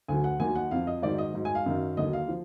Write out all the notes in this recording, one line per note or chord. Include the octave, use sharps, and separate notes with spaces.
D2 D3 F#3 G#5
F#5
D#2 D#3 F#3 G#5
F#5
F2 F3 F5
D#5
G#2 D#3 F#3 D5
D#5
G#2 F#3
G#5
F5
F#2 D#3 F#3
D#2 D3 F#3 D#5
F5
F3